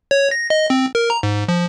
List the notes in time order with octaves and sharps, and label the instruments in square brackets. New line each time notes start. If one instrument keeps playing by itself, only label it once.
[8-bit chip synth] C#5
A#6
D#5
C4
A#4
A#5
G#2
F3